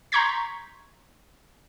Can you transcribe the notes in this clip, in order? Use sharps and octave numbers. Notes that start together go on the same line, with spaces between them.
A#5 C6 C#6 G6 G#6 B6